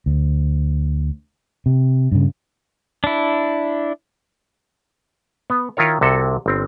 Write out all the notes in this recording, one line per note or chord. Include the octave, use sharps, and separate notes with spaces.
D2
C3
G2 C#3
D4 E4
B3
D#3 E4 F4 A#4 C#5
C2 C3 F#4 A4
G1 C4